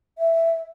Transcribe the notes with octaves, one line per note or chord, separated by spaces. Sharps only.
E5